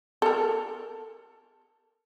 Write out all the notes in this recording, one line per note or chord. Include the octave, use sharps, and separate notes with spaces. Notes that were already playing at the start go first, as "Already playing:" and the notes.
A4 A#4